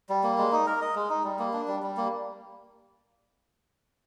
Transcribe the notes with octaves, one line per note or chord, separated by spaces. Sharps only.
G3
A#3
G#3
D#4
A#4
D#5
G#3
D#4
G3
A#3
D4
G3
G3
A#3